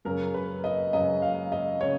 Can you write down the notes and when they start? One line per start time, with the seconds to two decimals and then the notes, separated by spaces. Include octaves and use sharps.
0.05 F#2 C#3 A#4
0.34 B4
0.64 D#5
0.93 F#2 C#3 D#5
1.22 F5
1.52 D#5
1.81 C#3 C#5